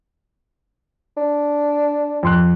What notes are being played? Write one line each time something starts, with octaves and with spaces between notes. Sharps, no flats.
D4
F2 C6 F#6